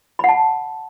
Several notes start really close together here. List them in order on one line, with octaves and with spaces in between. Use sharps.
B5 F#5 A5